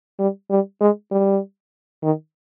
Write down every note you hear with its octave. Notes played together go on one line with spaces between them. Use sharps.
G3
G3
G#3
G3
D#3